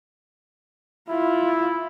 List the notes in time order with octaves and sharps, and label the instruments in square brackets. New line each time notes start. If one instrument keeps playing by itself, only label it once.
[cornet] E4 [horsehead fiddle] F4